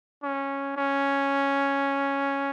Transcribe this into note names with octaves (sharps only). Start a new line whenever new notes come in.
C#4
C#4